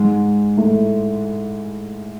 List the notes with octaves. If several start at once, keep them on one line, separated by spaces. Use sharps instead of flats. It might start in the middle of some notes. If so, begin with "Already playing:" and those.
Already playing: G#2 G#3
A2 A3